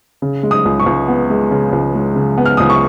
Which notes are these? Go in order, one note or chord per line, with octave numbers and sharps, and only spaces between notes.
C#3
G#3
D#6
C#2
C#6
C#2
B3
G#3
C#3
C#2
G#3
C#3
B3
F6
C#2 D#6
C#6